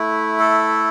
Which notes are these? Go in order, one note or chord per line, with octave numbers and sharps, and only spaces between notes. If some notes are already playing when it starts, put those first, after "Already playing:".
Already playing: A3 E4
A4